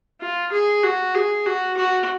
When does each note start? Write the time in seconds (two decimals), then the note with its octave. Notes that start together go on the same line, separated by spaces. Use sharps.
0.21 F4
0.52 G#4
0.83 F#4
1.15 G#4
1.46 F#4
1.77 F#4